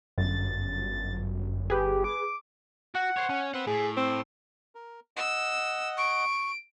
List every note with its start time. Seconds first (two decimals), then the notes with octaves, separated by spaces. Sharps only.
0.18 G1 F#2 A6
1.70 G4 G#4 B4
2.04 D6
2.95 F#4 F#5
3.17 C5 C#5
3.29 C#4
3.54 C4 B4 F#5
3.67 A2 G#4
3.97 C4
4.75 A#4
5.17 D#5 F#5 E6
5.97 C#6 D7